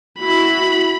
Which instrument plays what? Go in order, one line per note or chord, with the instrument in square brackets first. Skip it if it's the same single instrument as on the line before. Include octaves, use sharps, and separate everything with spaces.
[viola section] E4 F#4 [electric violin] B5